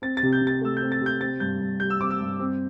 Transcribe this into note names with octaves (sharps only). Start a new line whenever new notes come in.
C4 A6
A6
C3
G6
C3
A6
A3 E6
G6
C4
A6
C3
G6
C4 A6
G2 G6
G2
G3 G6
E6
C4 D6
E6
G2
C4